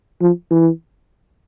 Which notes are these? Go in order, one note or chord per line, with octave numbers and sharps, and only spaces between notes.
F3
E3